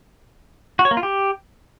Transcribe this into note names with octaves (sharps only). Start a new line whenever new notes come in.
F#4
C#5
A#3
F4
G4